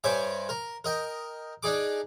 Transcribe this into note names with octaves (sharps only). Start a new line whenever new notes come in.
G2 C5 C#5 E5 G#5 D6
A#4
A#4 D#5 G5
D4 D#4 G#4 D6